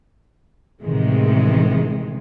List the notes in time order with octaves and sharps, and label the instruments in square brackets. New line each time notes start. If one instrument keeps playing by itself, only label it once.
[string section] A1 C3 D#3 E3 G#3